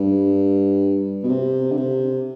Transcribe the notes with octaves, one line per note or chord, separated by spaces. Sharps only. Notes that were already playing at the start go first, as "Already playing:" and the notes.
Already playing: G2
B2
C3
D3
C3